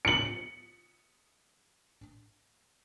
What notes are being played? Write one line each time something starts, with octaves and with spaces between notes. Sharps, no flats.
C#7 F#7